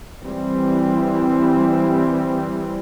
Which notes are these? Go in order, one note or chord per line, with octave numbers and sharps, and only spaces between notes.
E3 G3 C4